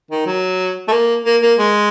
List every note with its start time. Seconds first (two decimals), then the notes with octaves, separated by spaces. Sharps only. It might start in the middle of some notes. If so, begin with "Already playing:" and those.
0.11 D#3
0.26 F#3
0.88 A3
0.92 A#3
1.25 A#3
1.42 A#3
1.59 G#3